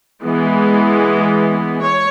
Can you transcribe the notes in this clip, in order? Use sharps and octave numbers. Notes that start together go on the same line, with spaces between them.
E3 G#3 B3
C#5